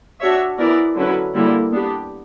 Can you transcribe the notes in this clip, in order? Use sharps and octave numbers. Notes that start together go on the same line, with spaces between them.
D4 F#4 C#5 E5
E3 B3 E4 A#4 D5
D3 F#3 C#4 E4 B4
D3 G3 A#3 E4
B3 D4 G4